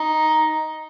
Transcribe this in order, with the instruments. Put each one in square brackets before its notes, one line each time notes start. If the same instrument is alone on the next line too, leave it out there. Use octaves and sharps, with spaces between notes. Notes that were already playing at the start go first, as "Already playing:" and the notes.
Already playing: [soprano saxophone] D#4